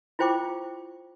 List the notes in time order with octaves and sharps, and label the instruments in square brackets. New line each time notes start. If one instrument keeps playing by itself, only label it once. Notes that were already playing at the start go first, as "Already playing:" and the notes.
[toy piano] E4 F4 C5 G5 C#6 D6